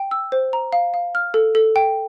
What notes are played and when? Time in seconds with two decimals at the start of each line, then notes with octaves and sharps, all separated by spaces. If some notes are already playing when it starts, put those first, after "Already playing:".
Already playing: G5
0.11 E6
0.32 C5
0.53 A#5
0.73 F5
0.94 F5
1.15 F6
1.34 A4
1.55 A4
1.76 G5